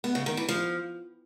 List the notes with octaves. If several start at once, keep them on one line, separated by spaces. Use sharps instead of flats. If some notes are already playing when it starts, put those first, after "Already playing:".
B3
C#3
D#3
E3
F3